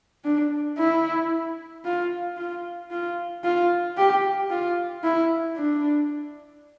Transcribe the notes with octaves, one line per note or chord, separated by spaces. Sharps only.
D4
E4
F4
F4
F4
F4
G4
F4
E4
D4